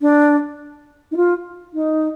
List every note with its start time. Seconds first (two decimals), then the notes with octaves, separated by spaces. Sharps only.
0.01 D4
1.11 D#4
1.16 F4
1.73 D#4